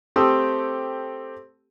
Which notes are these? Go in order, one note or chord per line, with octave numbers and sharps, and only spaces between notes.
A3 C4 G4 A4 D#6 E6